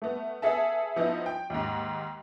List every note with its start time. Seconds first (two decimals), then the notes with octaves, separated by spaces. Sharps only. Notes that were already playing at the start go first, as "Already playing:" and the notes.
0.02 A3 B3
0.42 B3 G#4 A4 E5 A5
0.96 F3 B3 D#4 E4
1.26 G5
1.50 D#2 G#2